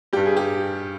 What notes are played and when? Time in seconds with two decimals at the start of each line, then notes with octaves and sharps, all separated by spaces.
0.13 G2 G3 G4
0.26 G#4
0.37 G4